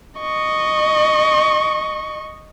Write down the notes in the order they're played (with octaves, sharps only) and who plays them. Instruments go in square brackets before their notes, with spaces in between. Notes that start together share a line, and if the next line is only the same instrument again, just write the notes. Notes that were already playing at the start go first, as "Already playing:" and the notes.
[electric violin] D#5 C#6